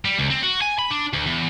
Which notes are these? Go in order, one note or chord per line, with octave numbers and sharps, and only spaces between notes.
G3
C#2
C4
F#4
G#5
B5
D4
D2
E2